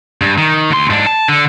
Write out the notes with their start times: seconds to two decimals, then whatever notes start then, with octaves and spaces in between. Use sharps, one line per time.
0.21 G2
0.38 D#3
0.71 D2 C6
0.90 G#2 D4
1.06 A5
1.29 D3